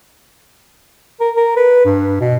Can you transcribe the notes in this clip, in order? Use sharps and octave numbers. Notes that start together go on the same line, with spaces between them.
A#4
A#4
B4
G2
B2